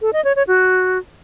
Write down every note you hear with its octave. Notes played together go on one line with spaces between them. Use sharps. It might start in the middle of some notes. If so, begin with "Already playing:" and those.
A4
D#5
C#5
C#5
F#4